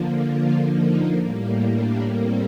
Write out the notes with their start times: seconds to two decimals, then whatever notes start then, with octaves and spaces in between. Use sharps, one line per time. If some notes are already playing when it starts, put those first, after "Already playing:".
Already playing: D3 F3 A#3
0.23 F4
0.71 D#4
1.19 A2 G3 A#3
1.68 D4
2.14 C4